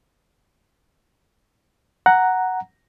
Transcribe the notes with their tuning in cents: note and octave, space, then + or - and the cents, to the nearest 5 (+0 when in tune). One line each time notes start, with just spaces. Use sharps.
F#5 +0 A#5 +0